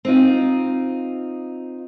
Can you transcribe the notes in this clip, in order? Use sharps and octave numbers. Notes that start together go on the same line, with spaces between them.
C4 D#4 F4